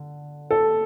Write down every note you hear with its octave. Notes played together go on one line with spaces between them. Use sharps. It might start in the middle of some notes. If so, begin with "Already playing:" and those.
Already playing: D3
A4